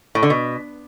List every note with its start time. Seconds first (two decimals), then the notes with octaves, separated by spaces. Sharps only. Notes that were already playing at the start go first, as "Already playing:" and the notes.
0.15 A2
0.23 D3
0.30 B2